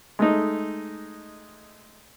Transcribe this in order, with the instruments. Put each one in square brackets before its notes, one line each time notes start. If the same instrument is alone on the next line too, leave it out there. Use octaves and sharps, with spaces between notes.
[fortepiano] G#3 A3 D#4